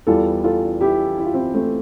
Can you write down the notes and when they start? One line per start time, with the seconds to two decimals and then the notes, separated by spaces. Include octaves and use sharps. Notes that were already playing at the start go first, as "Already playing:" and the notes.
0.07 E2 E3 G3 F4 A4
0.44 F4 A4
0.81 E4 G4
1.18 E4
1.25 F4
1.34 C4 E4
1.54 A3 C4